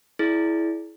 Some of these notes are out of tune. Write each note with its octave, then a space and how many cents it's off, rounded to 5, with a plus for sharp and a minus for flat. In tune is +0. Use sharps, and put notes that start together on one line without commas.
E4 +0 G#4 +35 D5 -10